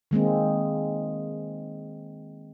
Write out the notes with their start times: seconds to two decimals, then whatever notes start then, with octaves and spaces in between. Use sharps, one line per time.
0.11 D#3 G#3 A#3 C4